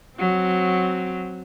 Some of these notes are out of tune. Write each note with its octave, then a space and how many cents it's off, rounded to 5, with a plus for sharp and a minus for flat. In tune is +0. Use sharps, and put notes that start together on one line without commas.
F#3 -5 C4 +0